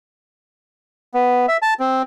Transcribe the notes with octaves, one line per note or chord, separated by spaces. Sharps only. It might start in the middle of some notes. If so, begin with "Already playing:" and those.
B3
E5
A5
C4